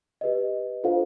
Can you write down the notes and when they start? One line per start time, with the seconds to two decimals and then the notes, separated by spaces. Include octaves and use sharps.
0.21 G4 B4 D#5
0.84 D4 F4 A4 C5 F5